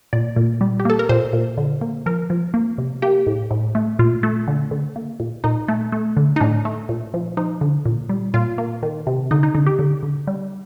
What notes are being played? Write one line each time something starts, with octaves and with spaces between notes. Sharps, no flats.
A#2 D5
A#2
G3
G4
A#3 A4
A#4
A#2 C5
A#2
D3
A#3
F3 A#4
F3
A#3
C3
A#3 G4
A2
A2
A3
A#2 F4
A3
D3
D3
A#3
A#2
A#2 D#4
A3
A3
D3
D#4
A2 D4
A3
A#2
F3
F3 D#4
D3
A#2
G3
A#2 F4
A#3
D#3
C3
D3 D#4
D#4
D3 D#4
G4
D3
D3
G3